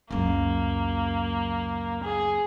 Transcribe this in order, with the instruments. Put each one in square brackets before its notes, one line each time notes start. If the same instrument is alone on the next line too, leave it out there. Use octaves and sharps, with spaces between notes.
[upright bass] C#2 F#2 [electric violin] A#3
[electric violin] G#4